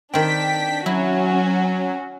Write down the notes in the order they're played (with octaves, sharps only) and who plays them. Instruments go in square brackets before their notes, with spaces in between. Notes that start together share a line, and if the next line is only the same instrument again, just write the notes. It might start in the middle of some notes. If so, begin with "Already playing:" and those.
[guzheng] D#3 C4 [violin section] D4 B6 [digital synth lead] G5
[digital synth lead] F#3 [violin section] C#4 F#4 [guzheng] E4